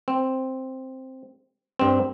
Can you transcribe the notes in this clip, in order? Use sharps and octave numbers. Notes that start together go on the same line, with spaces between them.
C4
G2 C4